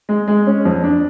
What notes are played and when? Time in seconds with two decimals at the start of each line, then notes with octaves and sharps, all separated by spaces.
0.09 G#3
0.28 G#3
0.47 C#4
0.65 F2
0.84 D4